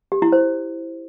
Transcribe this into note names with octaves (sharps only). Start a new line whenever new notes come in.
G4
E4
C5